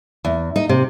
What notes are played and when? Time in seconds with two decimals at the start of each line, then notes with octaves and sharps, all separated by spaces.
0.25 E2
0.56 D#4
0.69 C3